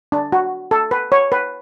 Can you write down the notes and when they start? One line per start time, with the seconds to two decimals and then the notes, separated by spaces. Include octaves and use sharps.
0.12 D4
0.32 F#4
0.71 A4
0.91 B4
1.12 C#5
1.32 B4